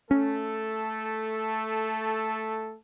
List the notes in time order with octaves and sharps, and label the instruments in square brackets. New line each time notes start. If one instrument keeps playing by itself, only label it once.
[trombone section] A3 A4 [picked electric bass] C#4